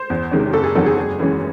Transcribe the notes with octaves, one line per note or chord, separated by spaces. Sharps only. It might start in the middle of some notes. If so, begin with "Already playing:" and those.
Already playing: C5
E2
C3 D#3 G#3 C#4
F#1 A4
G#4
E2 D#3 F#3 C4 A4
G#4
F#1
F#2 E3 G#3 C#4